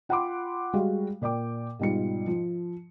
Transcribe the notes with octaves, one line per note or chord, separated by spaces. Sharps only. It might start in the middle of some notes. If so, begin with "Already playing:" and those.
F4 F#5 G5 B5 C6 D6
G3 G#3 F#4 F5
A#2 D5 G5 D6
G#2 B2 G3 F4 C#7
F3